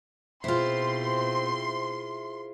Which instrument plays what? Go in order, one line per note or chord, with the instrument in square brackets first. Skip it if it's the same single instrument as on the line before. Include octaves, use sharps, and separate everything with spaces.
[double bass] B2 C4 [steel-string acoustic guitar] E4 F4 [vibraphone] G#4 C5 E5 [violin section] C6